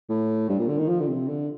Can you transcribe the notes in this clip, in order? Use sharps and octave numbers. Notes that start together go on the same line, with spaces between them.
A2
G2
A#2
D3
D#3
F3
D3
C3
D3